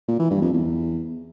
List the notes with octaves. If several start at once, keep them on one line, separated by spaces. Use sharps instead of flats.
A#2
E3
G2
F2
E2